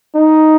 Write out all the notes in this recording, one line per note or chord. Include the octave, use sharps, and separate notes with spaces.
D#4